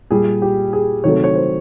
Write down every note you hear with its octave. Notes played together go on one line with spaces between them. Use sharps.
A#2 G3 G#4
G4
G#4
C3 D#3 F#3 A3 C#5
C#5
C5